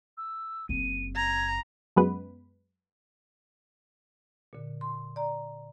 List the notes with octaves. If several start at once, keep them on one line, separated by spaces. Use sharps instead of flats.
E6
F#1 C4 D#7
A#5 G#6
F#2 G#3 B3 B4
A#2 D3
C6
D5 A#5